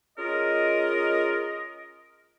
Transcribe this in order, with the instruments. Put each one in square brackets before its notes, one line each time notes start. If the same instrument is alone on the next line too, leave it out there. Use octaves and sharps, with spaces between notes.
[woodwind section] C#4 F4 G#4 A#4 D#5